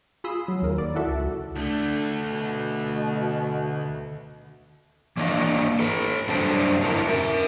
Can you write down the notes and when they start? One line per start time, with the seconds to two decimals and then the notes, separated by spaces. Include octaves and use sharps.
0.24 F4 G#4 B5 C6 D#6 E6
0.48 F#3
0.62 D#2 A#4
0.78 D5
0.95 E4 F#4 A4 E5
1.07 C#2
1.55 D2 A3 D4
2.25 B2
5.17 E3 A#3 D4 C#5 D#5 F5
5.80 A4 B4
6.29 F#2 G3 D4 C5 A5
6.83 F#2 B2 D3 E4 A#4
7.08 A#4 E5